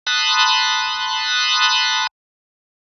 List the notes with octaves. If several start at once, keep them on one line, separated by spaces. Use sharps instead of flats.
A5 B5 C6 D#6 F#6